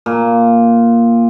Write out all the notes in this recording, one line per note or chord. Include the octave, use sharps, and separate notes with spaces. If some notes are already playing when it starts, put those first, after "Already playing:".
A#2